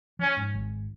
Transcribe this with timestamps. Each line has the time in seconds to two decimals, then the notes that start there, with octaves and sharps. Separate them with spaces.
0.19 F3 C#4
0.37 G#2
0.54 G#1